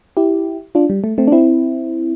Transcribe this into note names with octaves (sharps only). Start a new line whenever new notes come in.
E4 G4
D4 F4
G3
A3
A3 C4
D4
C4 E4